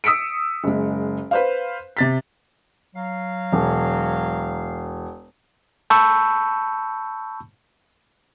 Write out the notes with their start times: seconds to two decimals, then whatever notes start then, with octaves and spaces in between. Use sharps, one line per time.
0.04 D#6 E6 B6 C#7 D7
0.64 F#1 G#3
1.31 B4 C5 F5
1.97 C3 A6 B6
2.94 F#3 F5
3.52 E1
5.90 A5 B5 C#6 E6 G6